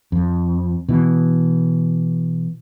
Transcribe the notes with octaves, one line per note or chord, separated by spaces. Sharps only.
F2
B2 E3